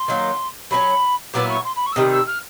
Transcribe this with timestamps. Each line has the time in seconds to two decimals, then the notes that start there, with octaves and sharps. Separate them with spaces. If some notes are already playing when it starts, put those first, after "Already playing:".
Already playing: C6
0.08 D#3 F#3 A#3
0.71 F#3 A#3 C#4 B5
1.34 A#2 F#3 B3 E4 D6
1.49 C#6
1.64 C6
1.76 B5
1.86 C#6
1.92 E6
1.96 C3 D#3 G3 D#6
2.12 E6
2.27 F6